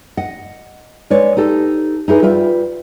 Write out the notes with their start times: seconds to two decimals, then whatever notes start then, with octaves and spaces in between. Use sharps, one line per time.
0.17 D#5 F#5
1.10 G#3 B4 C#5 D5
1.37 D#4 G4 A4
2.08 D#4 E4 G#4 B4
2.22 G3 F4 B4 E5